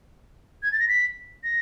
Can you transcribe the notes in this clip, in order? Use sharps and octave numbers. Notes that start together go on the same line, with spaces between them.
G#6
A6
A#6
B6
A#6